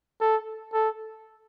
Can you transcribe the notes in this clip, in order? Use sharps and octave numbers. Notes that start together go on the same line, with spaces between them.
A4
A4